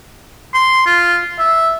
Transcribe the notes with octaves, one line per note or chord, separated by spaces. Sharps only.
C6
F4
E5